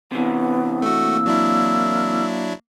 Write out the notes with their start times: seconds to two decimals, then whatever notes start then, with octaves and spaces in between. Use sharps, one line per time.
0.12 C3 E3 B3
0.82 A3 F#4 E6
0.99 A#3
1.26 F#3 D4 E4